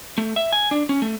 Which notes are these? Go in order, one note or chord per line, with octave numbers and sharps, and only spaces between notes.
A3
E5
G#5
D4
C#4
A3